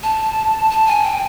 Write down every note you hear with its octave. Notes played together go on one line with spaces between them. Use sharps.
A5
A5
G#5
G5